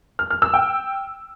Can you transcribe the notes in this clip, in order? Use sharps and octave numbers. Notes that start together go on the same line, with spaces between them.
F6
F6
E6
G5